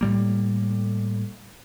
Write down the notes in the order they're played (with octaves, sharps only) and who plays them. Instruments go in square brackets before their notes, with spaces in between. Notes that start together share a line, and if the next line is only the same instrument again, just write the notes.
[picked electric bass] A2 G3 A#3